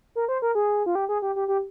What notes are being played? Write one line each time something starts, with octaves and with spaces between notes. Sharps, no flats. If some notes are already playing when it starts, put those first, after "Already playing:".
A#4
C5
A#4
G#4
F4
G4
G#4
G4
G4
G4